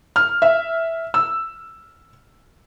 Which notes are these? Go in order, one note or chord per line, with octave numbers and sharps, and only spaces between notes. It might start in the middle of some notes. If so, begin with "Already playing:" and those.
F6
E5
E6